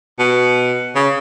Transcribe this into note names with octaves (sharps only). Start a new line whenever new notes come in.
B2
C#3